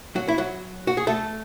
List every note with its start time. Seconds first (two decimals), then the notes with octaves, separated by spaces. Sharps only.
0.16 F#3 F#4
0.28 E4
0.38 F#3 F#4
0.87 F#4
0.97 G#4
1.07 A3 A4